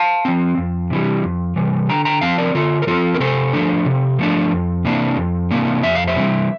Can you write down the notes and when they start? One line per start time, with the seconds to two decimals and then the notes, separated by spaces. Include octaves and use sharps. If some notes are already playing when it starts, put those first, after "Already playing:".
Already playing: F5 A5
0.25 F3 C4
0.58 F2
0.90 C3 E3 G3
1.24 F2
1.56 C3 E3 G3
1.89 D3 G5 A#5
2.05 G5 A#5
2.21 F3 C4 F5 A5
2.38 A#4 D5
2.55 D3 F4 A4
2.82 A#4
2.87 F3 C4 F4 A4
3.14 A#4
3.20 C3 A4 C5
3.53 F3 A3 D4
3.85 C3
4.19 F3 A3 D4
4.52 F2
4.85 C3 E3 A#3 D4
5.17 F2
5.51 C3 E3 A#3 D4
5.83 F2 E5
5.95 F5
6.07 C5 E5
6.15 C3 E3 G3 C4